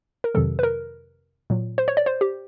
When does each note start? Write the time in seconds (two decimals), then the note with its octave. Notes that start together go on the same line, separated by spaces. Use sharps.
0.24 A#4
0.35 F2 C3 D#3 F#3 A4
0.59 B4
0.63 A#4
1.50 A#2 F#3
1.78 C5
1.88 C#5
1.97 D5
2.06 C5
2.21 G4